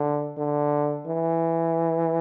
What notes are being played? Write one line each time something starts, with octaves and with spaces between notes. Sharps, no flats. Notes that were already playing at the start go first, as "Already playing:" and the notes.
Already playing: D3
D3
E3